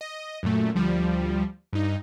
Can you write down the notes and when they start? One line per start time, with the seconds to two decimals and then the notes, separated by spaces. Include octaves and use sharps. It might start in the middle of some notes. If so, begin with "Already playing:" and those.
0.01 D#5
0.43 F#2 A#2 A3
0.75 D2 F3 G3
1.73 G2 D#4